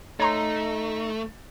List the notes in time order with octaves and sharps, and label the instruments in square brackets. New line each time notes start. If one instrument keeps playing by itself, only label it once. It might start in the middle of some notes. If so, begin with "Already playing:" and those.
[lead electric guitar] A3 [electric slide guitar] D#4 [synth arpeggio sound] C#5 A#5 C6